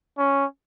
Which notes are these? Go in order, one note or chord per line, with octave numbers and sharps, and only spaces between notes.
C#4